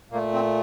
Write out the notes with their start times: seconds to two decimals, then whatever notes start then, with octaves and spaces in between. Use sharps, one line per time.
0.11 A#2 A#3
0.14 A3
0.34 C4